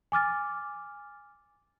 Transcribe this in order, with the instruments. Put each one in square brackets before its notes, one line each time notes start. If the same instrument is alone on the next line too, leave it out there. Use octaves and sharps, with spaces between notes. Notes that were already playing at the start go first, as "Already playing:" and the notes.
[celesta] G#5 D6 F6 A6